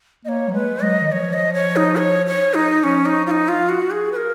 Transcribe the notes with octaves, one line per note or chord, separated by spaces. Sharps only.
A#3 C#5 D#5
F#3
G#3 B4
F#3 D#5
D#3
F3 C#5
D#5
C#5
D#4
C#5
C#5
D#4
F3 C#4
D#4
F4
D#4
F4
F#4
G#4
B4
A#4